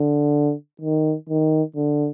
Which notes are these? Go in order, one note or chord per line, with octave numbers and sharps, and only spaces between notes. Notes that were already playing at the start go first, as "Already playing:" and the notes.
Already playing: D3
D#3
D#3
D3